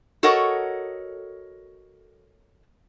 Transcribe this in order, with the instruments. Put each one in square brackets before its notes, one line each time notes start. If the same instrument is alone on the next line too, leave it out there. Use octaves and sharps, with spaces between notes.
[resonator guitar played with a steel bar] F#4 A4 A#4 C#5 D#5 F#5